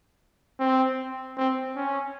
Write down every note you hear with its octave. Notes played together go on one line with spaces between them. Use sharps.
C4
C4
C#4